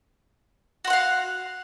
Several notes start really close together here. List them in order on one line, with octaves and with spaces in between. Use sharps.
F#4 C6 F#5 F5